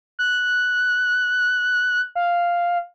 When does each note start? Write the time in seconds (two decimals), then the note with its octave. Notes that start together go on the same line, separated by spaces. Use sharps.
0.19 F#6
2.15 F5